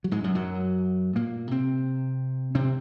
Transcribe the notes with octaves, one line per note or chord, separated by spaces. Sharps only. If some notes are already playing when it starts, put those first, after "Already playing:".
F#3
G#2 G#3
F#2 F#3
F#2 F#3
A#2 A#3
C3 C4
C3 C4